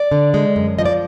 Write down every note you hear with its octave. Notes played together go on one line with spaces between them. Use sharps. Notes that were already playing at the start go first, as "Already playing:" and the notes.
Already playing: D5
D3
G#3
F#2
F3 D#5
D5